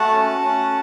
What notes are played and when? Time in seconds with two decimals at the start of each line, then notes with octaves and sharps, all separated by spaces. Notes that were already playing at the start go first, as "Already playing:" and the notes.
Already playing: A3 F#4 F#5 A5
0.13 C#4
0.41 C#4